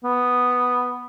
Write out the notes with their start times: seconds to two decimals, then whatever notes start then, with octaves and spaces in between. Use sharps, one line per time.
0.04 B3